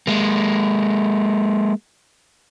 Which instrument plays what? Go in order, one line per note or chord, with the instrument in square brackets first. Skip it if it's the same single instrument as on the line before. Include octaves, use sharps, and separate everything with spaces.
[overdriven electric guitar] G#3 A#3